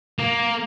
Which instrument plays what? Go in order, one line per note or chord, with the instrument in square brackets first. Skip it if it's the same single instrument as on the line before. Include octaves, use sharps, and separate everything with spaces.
[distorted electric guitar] A#3